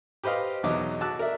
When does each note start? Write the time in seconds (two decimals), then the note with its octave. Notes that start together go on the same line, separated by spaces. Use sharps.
0.24 G4 B4 C5 D#5 F5
0.63 E2 B2 F#3 D#4 D#5 D6
1.01 F#4 A5 D6 E6 F#6
1.19 A#4 D5 E5